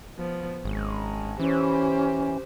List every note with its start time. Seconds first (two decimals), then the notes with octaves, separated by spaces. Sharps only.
0.16 F3 B3
0.65 G#1 G#3 C#4
1.40 E3 C#4 G4 C5